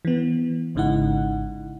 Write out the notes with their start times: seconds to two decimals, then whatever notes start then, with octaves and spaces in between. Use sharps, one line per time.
0.05 E3 B3
0.75 G#1 G#2 C#3 D#4 E4 F#5